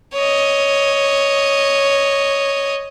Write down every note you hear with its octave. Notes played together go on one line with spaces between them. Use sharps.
C#5 D#5